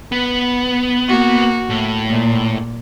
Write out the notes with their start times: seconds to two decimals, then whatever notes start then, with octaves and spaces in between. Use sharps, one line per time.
0.12 B3
1.09 A#3 F#4
1.70 A2
2.08 A#2